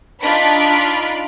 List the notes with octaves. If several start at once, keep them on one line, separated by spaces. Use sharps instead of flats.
D4 D#4 F4 B5 B6 D7